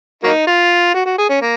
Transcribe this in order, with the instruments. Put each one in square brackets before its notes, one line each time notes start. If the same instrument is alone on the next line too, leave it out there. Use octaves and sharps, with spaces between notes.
[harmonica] F#3 A#3 D#4
F4
F#4
F#4
G#4
C#4
A#3